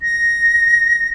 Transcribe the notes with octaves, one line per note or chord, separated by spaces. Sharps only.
A#6